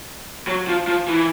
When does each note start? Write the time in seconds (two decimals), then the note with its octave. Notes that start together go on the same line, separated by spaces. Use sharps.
0.47 F#3
0.68 F3
0.88 F3
1.08 E3